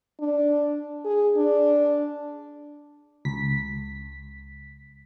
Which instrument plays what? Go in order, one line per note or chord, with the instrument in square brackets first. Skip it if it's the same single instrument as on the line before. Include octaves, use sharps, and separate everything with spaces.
[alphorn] D4
G#4
D4
[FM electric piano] C#2 B6